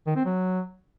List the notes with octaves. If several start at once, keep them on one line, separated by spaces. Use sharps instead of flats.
D#3
C4
F#3